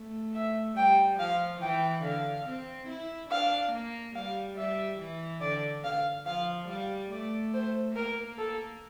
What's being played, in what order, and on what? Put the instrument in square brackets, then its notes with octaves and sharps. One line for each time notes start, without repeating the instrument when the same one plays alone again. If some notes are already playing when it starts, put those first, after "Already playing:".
Already playing: [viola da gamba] A3
[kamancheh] E5
[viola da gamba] G3 [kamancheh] G5
[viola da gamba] F3 [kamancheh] F5
[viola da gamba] E3 [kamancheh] G5
[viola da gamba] D3 [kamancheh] F5
[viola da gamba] C4
E4
[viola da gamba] D4 [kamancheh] F5
[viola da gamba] A#3
[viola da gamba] G3 [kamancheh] F5
[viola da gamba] G3 [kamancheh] E5
[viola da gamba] E3
[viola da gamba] D3 [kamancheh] D5
[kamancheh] F5
[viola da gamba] F3 [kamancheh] F5
[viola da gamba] G3 [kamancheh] F5
[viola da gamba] A3 [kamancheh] D5
[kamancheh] C5
[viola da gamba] A#3 [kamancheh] A#4
[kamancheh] A4